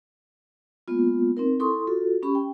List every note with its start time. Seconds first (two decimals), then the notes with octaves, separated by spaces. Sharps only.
0.88 G#3 A#3 B3 F4
1.37 C4 D#4 A#4
1.60 E4 A4 C6 C#6 D#6
1.87 F4 F#4 A4
2.23 C#4 G4 B5 C#6
2.35 G5